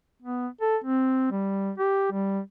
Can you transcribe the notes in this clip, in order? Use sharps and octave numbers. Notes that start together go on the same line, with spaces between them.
B3
A4
C4
G3
G4
G3